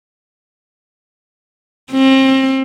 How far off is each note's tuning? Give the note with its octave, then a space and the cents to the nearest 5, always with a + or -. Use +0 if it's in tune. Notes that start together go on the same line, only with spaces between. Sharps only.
C4 +30